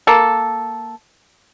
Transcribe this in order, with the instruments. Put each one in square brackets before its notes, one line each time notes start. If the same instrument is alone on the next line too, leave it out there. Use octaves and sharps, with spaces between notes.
[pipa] A#3 A4